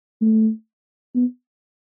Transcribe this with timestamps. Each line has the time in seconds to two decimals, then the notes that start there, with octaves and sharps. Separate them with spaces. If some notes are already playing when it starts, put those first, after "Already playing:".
0.22 A3
1.15 B3